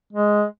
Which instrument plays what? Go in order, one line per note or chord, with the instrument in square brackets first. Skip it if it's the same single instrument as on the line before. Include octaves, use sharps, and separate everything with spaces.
[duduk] G#3